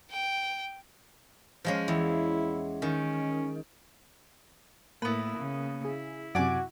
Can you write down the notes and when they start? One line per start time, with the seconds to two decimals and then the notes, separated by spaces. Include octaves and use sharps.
0.11 G5
1.65 F3 G#3 C#4
1.88 E2 E4
2.82 D#3 C#4
5.02 A2 A#3 B3 E4 B4
5.38 C#3
5.85 E4 G#4
6.35 F#2 C3 F#4 D5 G#5 D6